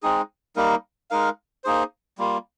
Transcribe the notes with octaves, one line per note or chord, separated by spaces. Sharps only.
G#3 C4 D#4 G#4
G3 A#3 D#4 A#4
G#3 D#4 A#4 F5
A#3 D#4 G#4 C5
G3 A#3 F4